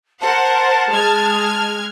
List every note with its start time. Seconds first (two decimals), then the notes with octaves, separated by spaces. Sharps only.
0.21 A#4 C5 F#5 A5
0.91 G#3 F6 G#6